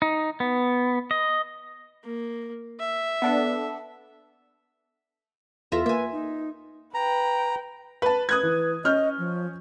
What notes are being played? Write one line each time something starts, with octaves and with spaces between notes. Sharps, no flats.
D#4
B3
D#5
A#3
E5
B3 D4 A4
E2 F4 A4 E5 A#5
A#3 B4 E5 G#5
D#4
B4 G5 A#5
B4 A5
B4 D#6 F#6 G#6
E3
C#4 D#5 F6 G6
F3